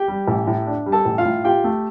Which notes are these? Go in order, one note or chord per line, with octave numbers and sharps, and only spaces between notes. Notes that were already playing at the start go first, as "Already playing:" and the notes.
Already playing: G4 G5
G3
A1
A2
D4
G3
A4 A5
A1
F4 F5
A2
F4 G4 G5
A3